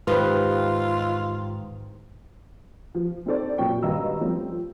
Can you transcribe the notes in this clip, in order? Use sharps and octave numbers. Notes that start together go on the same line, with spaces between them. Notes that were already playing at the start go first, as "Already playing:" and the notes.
E2 G#2 D#3 F4 G4 B4 C5
F3
C4 D4 D#4 A4 C5 D5
F#2 A#2 C#4 G5 C#6
G#1 G2 D#5 F5 A#5 E6
F3 G3 A3 C4 C#4 F4